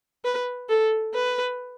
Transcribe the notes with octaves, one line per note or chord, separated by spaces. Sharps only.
B4
A4
B4